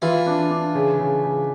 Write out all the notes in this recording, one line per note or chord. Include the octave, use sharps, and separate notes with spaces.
E3 E4 F4
D4
D4
C#3
C#3
C#3